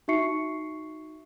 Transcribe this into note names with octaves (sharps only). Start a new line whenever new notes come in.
D#4 F#4 E5 C#6 C7 C#7